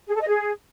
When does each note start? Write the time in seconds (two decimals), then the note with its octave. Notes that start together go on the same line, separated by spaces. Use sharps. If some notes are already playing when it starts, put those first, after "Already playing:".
0.08 G#4
0.14 A4
0.21 D#5
0.28 G#4